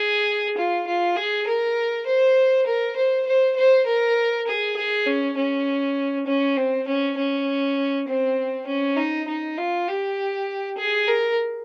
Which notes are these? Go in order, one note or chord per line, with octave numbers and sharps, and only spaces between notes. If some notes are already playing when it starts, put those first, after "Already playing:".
Already playing: G#4
F4
F4
G#4
A#4
C5
A#4
C5
C5
C5
A#4
G#4
G#4
C#4
C#4
C#4
C4
C#4
C#4
C4
C#4
D#4
D#4
F4
G4
G#4
A#4